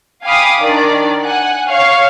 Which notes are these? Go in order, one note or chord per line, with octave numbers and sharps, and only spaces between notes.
F5 G5 G#5 B5 D6 D#6
D#3 D4 D5
F#5 G#5 F#6
C#5 F5 C#6